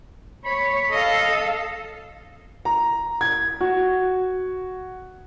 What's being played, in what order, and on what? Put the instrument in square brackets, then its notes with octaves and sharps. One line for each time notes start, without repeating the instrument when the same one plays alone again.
[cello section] C#5 [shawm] B5
[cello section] A4 F5 [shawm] D#5
[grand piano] A#5
G#6
F#4